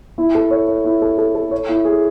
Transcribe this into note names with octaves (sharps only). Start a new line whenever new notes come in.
E4
A4
C#5
C#5
E4
A4
A4
A4
C#5
E4
G#4